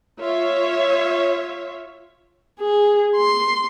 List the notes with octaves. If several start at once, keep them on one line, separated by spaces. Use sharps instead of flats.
F4 C#5 E5
G#4
C6